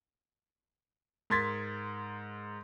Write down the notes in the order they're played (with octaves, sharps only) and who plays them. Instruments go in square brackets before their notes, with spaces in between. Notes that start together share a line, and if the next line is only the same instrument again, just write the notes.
[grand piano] G#2 A#4 C6 G#6 A6 B6